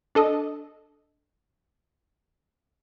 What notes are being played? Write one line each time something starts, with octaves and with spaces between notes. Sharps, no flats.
D4 A4 D#5